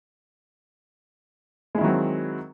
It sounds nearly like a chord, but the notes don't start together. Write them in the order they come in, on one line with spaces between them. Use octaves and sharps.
G#3 E4 D#3 F#3 C4